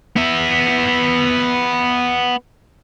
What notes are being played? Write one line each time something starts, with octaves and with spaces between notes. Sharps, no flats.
B3 E5